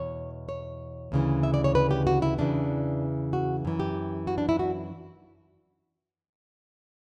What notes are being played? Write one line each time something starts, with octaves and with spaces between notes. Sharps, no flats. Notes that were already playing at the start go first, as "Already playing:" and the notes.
Already playing: E2 B2 C#5
C#5
D2 C#3 E3
E5
D5
C#5
B4
G4
F#4
E4
E2 C#3 E3 D4
F#4
F#2 E3
G4
F#4
D4
E4
F#4